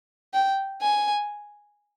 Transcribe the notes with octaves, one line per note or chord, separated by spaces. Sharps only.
G5
G#5